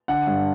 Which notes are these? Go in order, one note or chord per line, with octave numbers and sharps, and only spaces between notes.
D3 F#5
G2